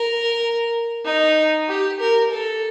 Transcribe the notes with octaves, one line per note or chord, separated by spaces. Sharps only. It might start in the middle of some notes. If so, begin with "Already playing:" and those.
Already playing: A#4
D#4
G4
A#4
A4